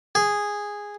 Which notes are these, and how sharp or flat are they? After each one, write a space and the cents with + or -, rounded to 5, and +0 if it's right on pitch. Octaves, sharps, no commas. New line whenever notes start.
G#4 -10